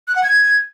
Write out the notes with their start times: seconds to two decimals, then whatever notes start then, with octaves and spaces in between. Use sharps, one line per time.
0.08 F#6
0.16 F#5
0.24 G#6